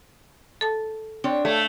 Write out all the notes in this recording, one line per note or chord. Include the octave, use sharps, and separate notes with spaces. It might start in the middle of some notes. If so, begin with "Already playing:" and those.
A4 A5
C4 D4 C#5 G5
A3 C#5